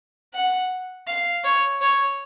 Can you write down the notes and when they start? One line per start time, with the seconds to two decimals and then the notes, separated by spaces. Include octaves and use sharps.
0.34 F#5
1.07 F5
1.44 C#5
1.81 C#5